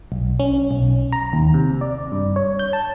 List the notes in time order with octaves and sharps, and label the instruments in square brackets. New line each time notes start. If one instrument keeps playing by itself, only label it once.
[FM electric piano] B1
C#4
B1
A#5
D#2
C3
D5
G2
C#5
G6
A5